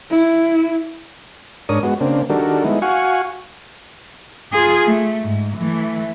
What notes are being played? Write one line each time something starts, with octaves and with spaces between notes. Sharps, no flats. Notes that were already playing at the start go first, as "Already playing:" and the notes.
E4
G#2 D4 A#4 C#5 D#6
G#3 B3 F#4
C#3 A#3 C4 D4
D#3 G3 D4 F#4 A4 A#4
G#3 B3 D#4 E4
F#4 F5 F#5 G#5 C#6
F4 G#4
A3
G#2
E3 A3